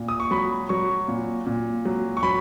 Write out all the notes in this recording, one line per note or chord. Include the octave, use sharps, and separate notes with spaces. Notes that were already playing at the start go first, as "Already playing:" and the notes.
Already playing: A#2
D#6
C#6
F#3 B5
F#3 C#6
A#2
A#2
F#3
C#6
F#3 B5